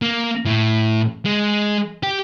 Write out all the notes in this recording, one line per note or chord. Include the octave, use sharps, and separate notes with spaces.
A#3
A2
G#3
G4